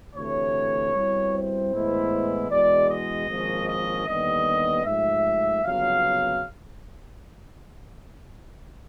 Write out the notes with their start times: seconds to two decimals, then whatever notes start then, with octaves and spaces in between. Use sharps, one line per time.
0.16 D2 C3 E3 A3 C#5
0.94 B2 G3 C4 E4
1.33 C5
1.72 A2 E3 G#3 B3 E4
2.50 E2 B2 G#3 D5
2.90 D#5
3.28 G#1 G#2 F3 A#3 C#4
3.68 D#5
4.07 D#2 D3 G3 B3 D#5
4.85 G#2 F3 A3 E5
5.64 G1 F2 C#3 F#3 B3 F5